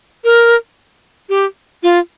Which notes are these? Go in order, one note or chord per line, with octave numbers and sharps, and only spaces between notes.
A#4
G4
F4